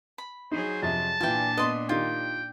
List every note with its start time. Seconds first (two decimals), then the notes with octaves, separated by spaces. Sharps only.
0.18 B5
0.52 F#3 D#4 G#4 C5
0.83 F2 C3 A5
1.20 A#2 E3 D4 F4 G5 G#5
1.57 B3 B4 D#5 C6
1.89 D#3 D#4 F4 G4 G5